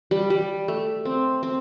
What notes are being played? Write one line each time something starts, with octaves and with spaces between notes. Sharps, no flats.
G3
G3
A3
C4
C4